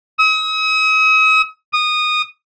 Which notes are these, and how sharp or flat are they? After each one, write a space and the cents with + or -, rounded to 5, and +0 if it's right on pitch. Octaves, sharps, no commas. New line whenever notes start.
D#6 +45
D#6 -15